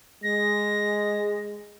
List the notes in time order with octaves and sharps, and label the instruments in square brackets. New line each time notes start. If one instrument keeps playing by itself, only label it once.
[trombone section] G#3 [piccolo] A#6